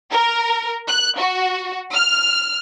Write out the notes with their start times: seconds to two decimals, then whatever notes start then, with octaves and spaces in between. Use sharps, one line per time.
0.11 A#4
0.87 F#6
1.18 F#4
1.92 F6